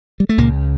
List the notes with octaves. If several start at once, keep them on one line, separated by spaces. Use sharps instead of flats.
G3
A3
C#2 A#2 C#3 A#3